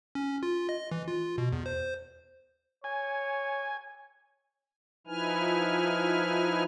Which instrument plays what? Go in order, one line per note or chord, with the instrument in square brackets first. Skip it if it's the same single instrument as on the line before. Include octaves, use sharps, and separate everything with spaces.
[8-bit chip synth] C#4
F4
D#5
E3
F4
B2
E2
C5
[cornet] C#5 [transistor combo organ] G#5
[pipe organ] F3 D#4 E4 B4 G#5 F6